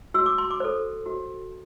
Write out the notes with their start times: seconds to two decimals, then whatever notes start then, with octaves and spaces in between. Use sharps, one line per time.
0.14 F#4 E6
0.26 D6
0.38 C6
0.50 D6
0.60 A4 C5
1.06 F#4